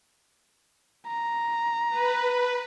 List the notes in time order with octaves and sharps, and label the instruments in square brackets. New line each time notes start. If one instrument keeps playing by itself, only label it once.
[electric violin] A#5
[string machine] B4